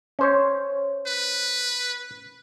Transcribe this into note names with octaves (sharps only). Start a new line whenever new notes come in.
C#4 C5 C#5
B4